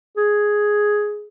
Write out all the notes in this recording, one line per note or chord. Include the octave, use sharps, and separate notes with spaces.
G#4